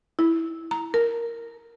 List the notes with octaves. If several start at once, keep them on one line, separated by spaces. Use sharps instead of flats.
E4
A#5
A#4